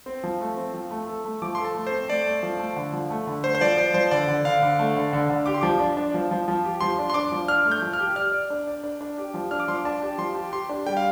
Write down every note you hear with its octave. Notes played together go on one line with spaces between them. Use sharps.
C4
F3
A3
C4
F3
A3
A4
A3
F3 D6
A4 C6
A5
A3
C5
C4
A3 D5
A3
F3
A3
D3
F3
A3
D3
A3 C5
C5
F3 D5
F3 D5
F3 C5
D3 D5
D3
D3 F5
D3
A3
D3
D3
D3
G4 D6
C6
F3 D6
D4
D4
F3
F3
F3
G4
F3 C6
D4
C6
D4 D6
F3
D4 F6
A3
G6
F3
F6
G4
D5 F6
D5
D4
D5
D4
D4
G4
F3
D4 F6
D6
F3 C6
D6
D4 A5
G4
F3 C6
G4
G4 C6
D4
G3 G5
F5